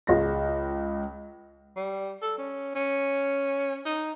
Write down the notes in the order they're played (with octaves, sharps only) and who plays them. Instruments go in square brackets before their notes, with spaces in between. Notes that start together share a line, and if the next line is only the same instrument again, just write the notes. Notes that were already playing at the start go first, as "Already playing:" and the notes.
[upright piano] C#2 G#3 A#6
[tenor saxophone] G3
A4
C#4
C#4
D#4